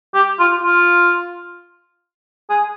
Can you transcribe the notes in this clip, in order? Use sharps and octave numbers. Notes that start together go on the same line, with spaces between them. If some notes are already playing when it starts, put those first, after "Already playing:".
G4
F4
F4
G#4